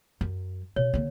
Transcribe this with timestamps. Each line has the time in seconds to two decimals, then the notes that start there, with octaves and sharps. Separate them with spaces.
0.21 F#2
0.76 B2 C#5
0.94 D3 A#3